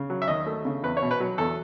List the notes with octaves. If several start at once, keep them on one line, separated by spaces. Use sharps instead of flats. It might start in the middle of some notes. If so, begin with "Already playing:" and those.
Already playing: C#3
F#3
E5
D#2 D#5
A3
C#3
E2 B4
C#5
B2
B4
F#3
E2 A4